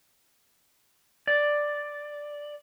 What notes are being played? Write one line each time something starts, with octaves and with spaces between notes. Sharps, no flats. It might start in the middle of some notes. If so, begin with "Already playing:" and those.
D5